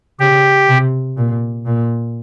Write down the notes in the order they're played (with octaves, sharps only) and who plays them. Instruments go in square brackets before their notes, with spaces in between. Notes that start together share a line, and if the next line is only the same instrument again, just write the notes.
[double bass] C#3 [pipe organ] G4
[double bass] C3
A#2
A#2